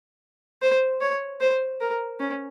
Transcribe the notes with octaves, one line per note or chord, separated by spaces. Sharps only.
C5
C#5
C5
A#4
C#4